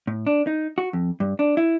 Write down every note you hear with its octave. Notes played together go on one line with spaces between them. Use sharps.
A2
D4
D#4
F#4
F2
G2
D4
E4